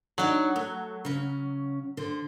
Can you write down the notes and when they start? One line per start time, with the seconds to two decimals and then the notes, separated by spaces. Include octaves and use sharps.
0.18 F#3 D4 D#4 D5
0.56 A3
1.05 C#3 C#4
1.97 D3 C5